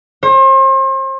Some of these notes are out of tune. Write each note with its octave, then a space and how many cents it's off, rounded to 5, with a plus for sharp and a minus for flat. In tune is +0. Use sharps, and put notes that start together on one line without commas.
C5 +40